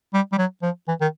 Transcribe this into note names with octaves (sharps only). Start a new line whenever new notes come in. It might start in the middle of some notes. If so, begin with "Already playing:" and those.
G3
G3
F#3
F3
E3
D#3